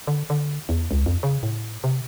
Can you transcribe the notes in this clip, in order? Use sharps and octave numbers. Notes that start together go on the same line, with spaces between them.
D3
D3
E2
C#2
F2
C#3
A2
C3